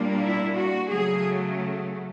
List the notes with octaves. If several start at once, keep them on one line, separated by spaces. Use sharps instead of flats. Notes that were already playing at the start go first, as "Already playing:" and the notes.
Already playing: A#2 G3 A#3 D4
E4
F#4
C#3 F#3 A3 G#4